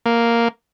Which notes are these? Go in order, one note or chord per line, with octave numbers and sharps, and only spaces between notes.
A#3